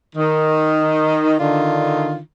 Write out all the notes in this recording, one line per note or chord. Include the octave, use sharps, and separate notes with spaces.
D#3
D3 D#3 D4 F4